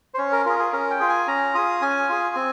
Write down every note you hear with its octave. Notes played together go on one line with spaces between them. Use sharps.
C5
C#4 C#5
A#4
F4 G#4 A#4
G#4
C#4 A#4
G5
F4 G#4
G#5
C#4 A#5
F4 G#4 D#6
C#4 G#5
F4 G#4
C4